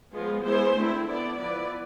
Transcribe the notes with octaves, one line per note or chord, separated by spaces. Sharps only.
F3 G#3 B3 F4 G#4
G#3 B3 E4 G#4 C5
D3 A3 C4 E4
B3 E4 A4 D5
F3 B3 E4 B4 D5